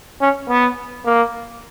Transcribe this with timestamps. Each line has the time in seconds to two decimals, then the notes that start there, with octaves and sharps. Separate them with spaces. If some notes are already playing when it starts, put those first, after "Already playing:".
0.21 C#4
0.49 B3
1.05 A#3